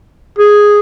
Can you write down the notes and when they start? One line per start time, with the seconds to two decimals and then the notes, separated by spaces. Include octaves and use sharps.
0.39 G#4